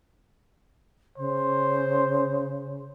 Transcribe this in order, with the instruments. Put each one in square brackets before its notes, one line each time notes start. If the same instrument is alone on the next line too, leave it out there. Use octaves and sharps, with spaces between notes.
[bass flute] C#3 [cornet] C5